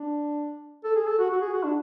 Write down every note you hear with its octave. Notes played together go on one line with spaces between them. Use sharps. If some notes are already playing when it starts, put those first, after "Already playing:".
Already playing: D4
A4
G#4
A4
F#4
F#4
G#4
F#4
D4